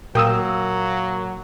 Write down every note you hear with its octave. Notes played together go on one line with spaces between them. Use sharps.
A#2 F#3 A#3 G5 D#6 E6